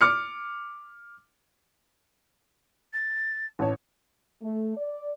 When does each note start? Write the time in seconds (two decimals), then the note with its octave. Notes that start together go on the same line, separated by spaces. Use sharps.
0.01 D6 F6 C#7
2.93 A6
3.59 A1 C#5 A5
4.42 A3
4.76 D5